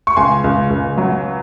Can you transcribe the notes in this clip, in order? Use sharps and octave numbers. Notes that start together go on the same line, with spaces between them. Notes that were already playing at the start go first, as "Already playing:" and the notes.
C#6
C#2 G#5 C6
C#2
C#2
F#3